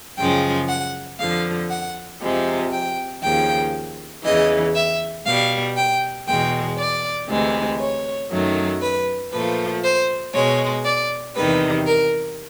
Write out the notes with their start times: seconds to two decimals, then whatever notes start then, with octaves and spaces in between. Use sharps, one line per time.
0.18 F#2 C#3 F3 G#3 G5
0.69 F#5
1.20 F2 D3 F3 F5
1.70 F#5
2.22 F2 C3 F3 G#3
2.72 G5
3.23 D#2 C#3 F3 G5
4.24 E2 C#3 E3 D#5
4.75 E5
5.26 B2 G3 F5
5.77 G5
6.27 E2 B2 G#3 G5
6.79 D5
7.29 D2 C3 E3 G#3
7.80 C#5
8.31 F#2 D#3 F#3 A3
8.82 B4
9.33 A#2 F3 A3 B4
9.84 C5
10.34 B2 G#3 C#5
10.85 D5
11.36 E2 C3 D#3 G3 B4
11.87 A#4